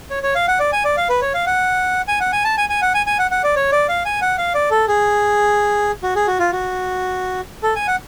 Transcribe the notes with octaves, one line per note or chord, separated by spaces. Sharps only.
C#5
C#5
F5
F#5
D5
G#5
D5
F5
B4
C#5
F5
F#5
G#5
F#5
G#5
A5
G#5
G#5
F#5
G#5
G#5
F#5
F#5
D5
C#5
D5
F5
G#5
F#5
F5
D5
A4
G#4
F#4
G#4
F#4
F4
F#4
A4
G#5
F#5